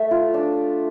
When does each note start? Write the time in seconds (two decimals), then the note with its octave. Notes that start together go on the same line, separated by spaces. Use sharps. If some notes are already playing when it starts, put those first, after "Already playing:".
Already playing: A3 E5
0.11 F4
0.34 D4